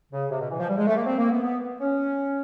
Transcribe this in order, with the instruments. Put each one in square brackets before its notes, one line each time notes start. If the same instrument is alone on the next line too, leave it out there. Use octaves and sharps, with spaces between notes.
[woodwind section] C#3
C3
B2
E3
F3
G3
G#3
A3
A#3
C4
A#3
B3
B3
C#4